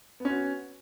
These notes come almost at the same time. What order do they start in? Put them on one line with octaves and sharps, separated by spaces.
B3 C#4 F#4